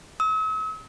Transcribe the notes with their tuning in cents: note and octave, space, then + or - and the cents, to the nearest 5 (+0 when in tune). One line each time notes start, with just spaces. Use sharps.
E6 -45